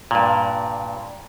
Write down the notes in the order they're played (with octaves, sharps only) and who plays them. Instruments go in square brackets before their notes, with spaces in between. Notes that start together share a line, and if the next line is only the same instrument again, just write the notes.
[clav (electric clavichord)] G2 A#2